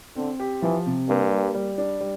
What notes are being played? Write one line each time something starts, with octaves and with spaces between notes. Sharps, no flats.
D3 C4
G4
E3 F3
C3
G2 A#3
G3
G3
D4
G3